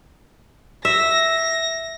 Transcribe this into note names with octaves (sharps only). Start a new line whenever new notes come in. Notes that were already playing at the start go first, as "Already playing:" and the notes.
E5 A#6